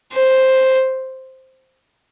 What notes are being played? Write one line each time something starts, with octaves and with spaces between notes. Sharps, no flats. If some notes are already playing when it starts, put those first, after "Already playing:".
C5